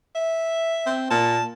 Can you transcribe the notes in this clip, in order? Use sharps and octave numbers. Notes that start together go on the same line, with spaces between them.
E5
C4
A#2 A5